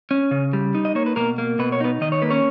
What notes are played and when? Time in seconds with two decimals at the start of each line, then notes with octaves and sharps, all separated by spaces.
0.11 C#4
0.31 C#3
0.53 G3
0.75 D#4
0.85 D#5
0.95 A#3 C#5
1.06 B4
1.16 B2 A#3 A#4
1.38 A#3
1.59 B2 B4
1.72 C#5
1.81 B3 D#4 B4
2.01 D#3 D#5
2.12 C#5
2.22 A#3 B4
2.30 C#4 C#5